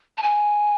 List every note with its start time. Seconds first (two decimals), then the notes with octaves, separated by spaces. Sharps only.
0.18 A5
0.22 G#5